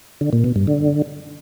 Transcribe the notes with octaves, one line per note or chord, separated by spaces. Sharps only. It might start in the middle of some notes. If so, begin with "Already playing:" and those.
D3
A#2
B2
G2
D3